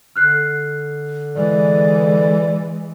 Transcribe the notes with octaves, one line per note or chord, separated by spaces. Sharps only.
D3 F6 F#6 C7
E3 G#3 D5